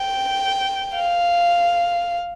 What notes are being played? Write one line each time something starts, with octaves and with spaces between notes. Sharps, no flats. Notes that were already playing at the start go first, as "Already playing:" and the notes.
Already playing: G5
F5